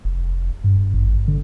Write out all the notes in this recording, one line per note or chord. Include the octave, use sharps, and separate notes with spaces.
F1
G2
G#1
D3